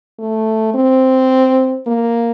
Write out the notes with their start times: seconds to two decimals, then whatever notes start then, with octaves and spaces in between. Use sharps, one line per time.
0.19 A3
0.74 C4
1.87 A#3